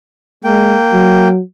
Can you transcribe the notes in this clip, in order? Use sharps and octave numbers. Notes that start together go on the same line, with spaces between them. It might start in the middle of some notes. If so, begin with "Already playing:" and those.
G#3 A#3 G5
F#3